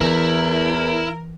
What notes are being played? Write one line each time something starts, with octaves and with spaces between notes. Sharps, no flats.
E2 E3 E4 A#4